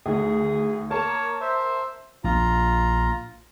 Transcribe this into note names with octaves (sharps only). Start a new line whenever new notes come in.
D2 D#3 G#4
A#3 A#4 C#5 A5
C5 E5
A#1 F4 A#5